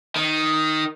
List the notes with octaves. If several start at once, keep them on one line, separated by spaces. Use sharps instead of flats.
D#3